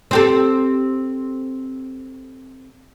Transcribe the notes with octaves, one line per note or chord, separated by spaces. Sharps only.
C4 G4 A4